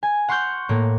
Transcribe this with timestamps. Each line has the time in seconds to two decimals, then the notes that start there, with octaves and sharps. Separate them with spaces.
0.03 G#5
0.28 F#5 C6 C#6 F6 G6
0.69 A2 A#3